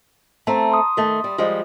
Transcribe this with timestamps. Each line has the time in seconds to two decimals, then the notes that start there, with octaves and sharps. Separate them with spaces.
0.47 A3 C4 A5 A#5
0.72 C6 D#6
0.97 D#3 A3
1.24 G3
1.38 F3 G3 G#3